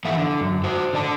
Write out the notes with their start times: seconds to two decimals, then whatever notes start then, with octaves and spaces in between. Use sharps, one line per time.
0.05 E3 A3 A4 E5 F#5
0.17 D3
0.41 F#2
0.64 F#4 C5
0.93 D3 D5 A5